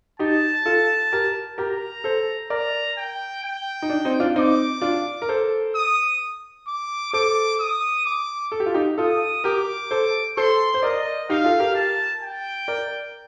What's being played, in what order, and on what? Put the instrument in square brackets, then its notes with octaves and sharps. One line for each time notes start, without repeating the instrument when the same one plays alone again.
[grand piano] D#4 G4 [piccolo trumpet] A5
[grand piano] F4 A4
G4 A#4
[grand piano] G4 A#4 [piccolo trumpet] A#5
[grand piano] A4 C5
[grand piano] A#4 D5 [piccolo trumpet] A#5
[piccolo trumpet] G5
G5
[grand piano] D#4
D4
C4 D#4
D4 F4
[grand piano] C4 D#4 [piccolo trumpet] D6
[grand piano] D4 F4
A#4
A4 C5
[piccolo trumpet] D#6
D6
[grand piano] A4 C5 [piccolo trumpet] D6
[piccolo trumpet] D#6
D6
[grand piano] A4
G4
F4
D#4 G4
[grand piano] F4 A4 [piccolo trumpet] D#6
[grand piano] G4 A#4 [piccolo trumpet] D6
[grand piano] A4 C5
[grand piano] A4 C5 [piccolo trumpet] C6
[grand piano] C5
[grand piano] A#4 D5 [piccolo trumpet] D#5
[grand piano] D#4 G4 [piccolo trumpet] F5
[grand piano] F4 A4
G4 A#4
[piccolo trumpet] A5
G5
[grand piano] A#4 D5